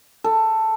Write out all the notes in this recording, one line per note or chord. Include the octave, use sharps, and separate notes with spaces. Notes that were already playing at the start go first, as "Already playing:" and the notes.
A4